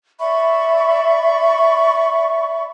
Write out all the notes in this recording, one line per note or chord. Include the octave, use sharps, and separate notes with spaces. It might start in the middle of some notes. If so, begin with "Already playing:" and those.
D5 E5 B5 C#6